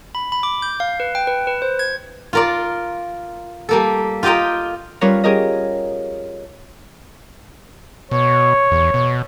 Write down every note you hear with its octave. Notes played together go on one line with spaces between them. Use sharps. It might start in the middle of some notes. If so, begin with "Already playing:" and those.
B5
B5
D6
G6
F5
B4
G5
B4
B4
C5
G#6
F4 A#4 D5
G3 A#3 A4
F4 G4 D#5 G5 A#5
G3 C#4 F4 A#4 B4 C#5
C#4 G4 G#4 A#4 D#5
B2 C#5
E2
B2